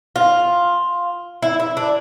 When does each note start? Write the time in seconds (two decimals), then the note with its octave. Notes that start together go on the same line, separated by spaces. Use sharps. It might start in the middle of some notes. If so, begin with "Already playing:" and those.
0.16 F4
1.42 E4
1.60 E4
1.77 D4